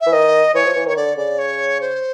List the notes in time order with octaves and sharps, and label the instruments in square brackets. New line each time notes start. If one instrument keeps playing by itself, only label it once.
[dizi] E5
[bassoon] E3
[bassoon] D#3 [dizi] D#5
[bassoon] E3 [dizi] C#5
[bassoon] F3
E3
[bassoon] D#3 [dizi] C#5
[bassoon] D3 [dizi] D5
[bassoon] C#3 [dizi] D5
[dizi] C#5
C5